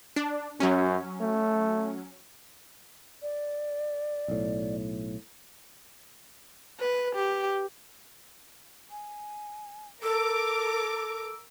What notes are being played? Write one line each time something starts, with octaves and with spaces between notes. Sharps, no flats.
D4
F#2 F#3 C#4
A3
D5
B1 A2
B4
G4
G#5
A4 A#4 D6 E6